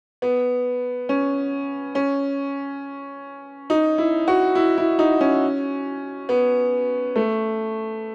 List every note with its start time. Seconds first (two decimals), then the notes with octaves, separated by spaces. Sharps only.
0.22 B3
1.09 C#4
1.95 C#4
3.70 D#4
3.98 E4
4.28 F#4
4.55 E4
4.78 E4
4.99 D#4
5.21 C#4
6.29 B3
7.16 A3